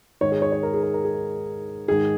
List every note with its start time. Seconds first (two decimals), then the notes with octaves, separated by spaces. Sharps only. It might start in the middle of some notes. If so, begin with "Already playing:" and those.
0.21 G#2 D#3 C#5
0.32 G#4
0.42 C#5
0.52 C#5
0.63 A#4
0.73 G#4
0.83 A#4
0.94 A#4
1.04 G#4
1.88 G#2 D#3 G#4